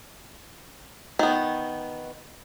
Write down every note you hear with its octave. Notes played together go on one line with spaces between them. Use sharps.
D#3 B3